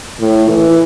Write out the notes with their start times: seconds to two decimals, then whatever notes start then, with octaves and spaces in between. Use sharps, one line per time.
0.20 A2
0.49 E3